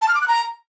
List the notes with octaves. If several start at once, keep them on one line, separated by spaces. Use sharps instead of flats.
A5
F6
D6
F#6
A#5